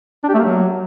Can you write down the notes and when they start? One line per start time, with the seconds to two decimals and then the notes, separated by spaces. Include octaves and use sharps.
0.24 D4
0.29 G4
0.34 A3
0.39 A#3
0.44 F#3